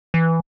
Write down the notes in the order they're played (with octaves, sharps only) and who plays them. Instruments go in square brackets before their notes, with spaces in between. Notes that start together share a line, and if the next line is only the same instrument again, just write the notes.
[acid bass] E3